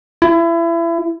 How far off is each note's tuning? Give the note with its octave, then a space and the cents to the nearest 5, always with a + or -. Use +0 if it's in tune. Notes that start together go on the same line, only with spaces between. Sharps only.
E4 +30